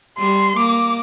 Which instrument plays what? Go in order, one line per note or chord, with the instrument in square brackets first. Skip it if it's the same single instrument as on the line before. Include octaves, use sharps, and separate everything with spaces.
[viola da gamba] G3 [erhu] C6
[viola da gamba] A#3 [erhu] D6